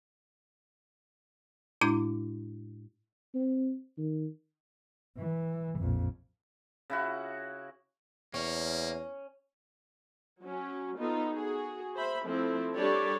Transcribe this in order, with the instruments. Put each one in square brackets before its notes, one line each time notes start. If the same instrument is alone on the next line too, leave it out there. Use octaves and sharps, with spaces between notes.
[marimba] A2 G#3 D4 E4 D6 G6
[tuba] C4
D#3
[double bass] E3
A#1 F2
[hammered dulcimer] C#3 E4 F#4
[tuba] E2 [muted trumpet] A#3 [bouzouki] C#4
[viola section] F#3 C#4
B3 D#4 F4 A4
F#4 G#4
C5 E5 B5
F3 A3 C4 E4 A4
G3 D4 G4 A4 C#5 D5